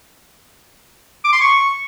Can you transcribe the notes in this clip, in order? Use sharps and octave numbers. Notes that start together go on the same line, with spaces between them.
D6
C6
C#6